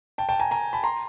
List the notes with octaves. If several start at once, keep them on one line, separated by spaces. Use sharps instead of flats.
G5 A5
G5 A5
G#5 A#5
G#5 A#5
A5 B5
A#5 C6